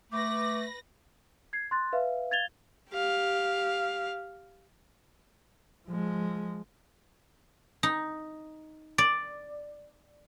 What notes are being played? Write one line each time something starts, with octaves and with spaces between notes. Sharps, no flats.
A3 B4 D6 A#6
G#6 C7
C6 F#6 A6
B4 E5 F5
F5 G#6 A6 F7 G7
G4 F5
F3 G#3
D#4
D5